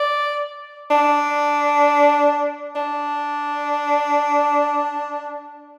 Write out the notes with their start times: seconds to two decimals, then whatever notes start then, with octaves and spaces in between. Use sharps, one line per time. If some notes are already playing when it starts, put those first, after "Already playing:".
Already playing: D5
0.90 D4
2.76 D4